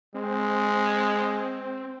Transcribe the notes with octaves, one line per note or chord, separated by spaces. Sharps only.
G#3 C4